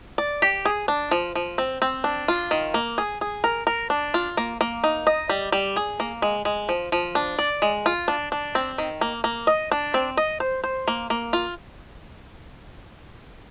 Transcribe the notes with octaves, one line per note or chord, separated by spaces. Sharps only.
D5
G4
G#4
D4
F3
F3
C4
C4
D4
F4
D#3
A#3
G#4
G#4
A#4
A#4
D4
F4
A#3
A#3
D#4
D#5
G3
G3
G#4
A#3
G#3
G#3
F3
F3
D4
D5
G#3
F4
D4
D4
C4
D#3
A#3
A#3
D#5
D4
C4
D#5
C5
C5
A#3
A#3
F4